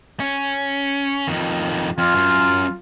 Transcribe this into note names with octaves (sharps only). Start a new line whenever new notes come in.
C#4
F2 D#3
F2 F4
F#2